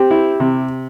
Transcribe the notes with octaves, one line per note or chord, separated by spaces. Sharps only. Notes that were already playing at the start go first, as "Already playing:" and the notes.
Already playing: C4 G4
E4
C3